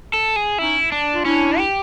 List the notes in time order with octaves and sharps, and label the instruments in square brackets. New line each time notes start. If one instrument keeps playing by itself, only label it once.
[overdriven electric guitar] A4
G#4
[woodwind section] C#4 D#4 [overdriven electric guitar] E4
[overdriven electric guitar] D4
[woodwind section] F4
[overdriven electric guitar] C#4 [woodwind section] D4 E4
[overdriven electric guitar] G4